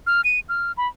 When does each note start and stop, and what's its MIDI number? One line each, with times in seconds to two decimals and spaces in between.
0.07 0.21 89
0.24 0.40 99
0.49 0.72 89
0.77 0.88 83